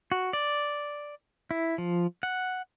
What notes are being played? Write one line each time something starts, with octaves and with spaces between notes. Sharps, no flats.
F#4
D5
E4
F3
F#5